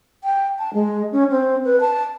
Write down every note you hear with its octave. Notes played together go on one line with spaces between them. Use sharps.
G5
A5
G#3
C#4
C4
B4
A5